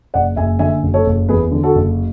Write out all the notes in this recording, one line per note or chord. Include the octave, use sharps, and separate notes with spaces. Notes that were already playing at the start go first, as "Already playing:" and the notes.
F#1 D5 F#5
F#1 E5 G#5
D3 E5 G#5
F#1
A4 C#5
F#1
E2 G#4 B4
D3
F#4 A4
F#1